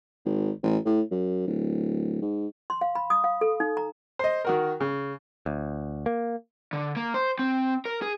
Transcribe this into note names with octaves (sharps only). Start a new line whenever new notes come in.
G#1
A1
A2
F#2
D1
G#2
C6
F5
B5
D#6
F5
A4
D#4
A#5
C5 D#5
D#3 F#4 A#4
C#3
D2
A#3
D3
A#3
C5
C4
A#4
G#4